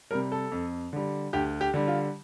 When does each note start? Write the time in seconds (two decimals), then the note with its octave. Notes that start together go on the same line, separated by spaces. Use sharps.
0.11 C3 G3 A#4
0.32 A4
0.52 F2
0.93 D3 G3
1.33 D2 G4
1.61 G4
1.74 D3 G3
1.88 F4